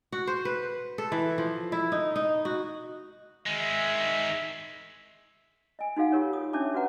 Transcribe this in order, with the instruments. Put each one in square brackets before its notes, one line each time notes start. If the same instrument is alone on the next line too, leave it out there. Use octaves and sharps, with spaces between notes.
[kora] F#4
C5
B4
A4
E3
F3
E4
D#4
D#4
F#4
[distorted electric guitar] D#3 G#3 [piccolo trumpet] E5
[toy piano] D#5 G#5
D#4 F#4 A4 F5 F#5
F4 G4 A#4 C#5
D#6
C#4 D4 C#5 E5 A5 D6
F#4 B4 F#5 A#5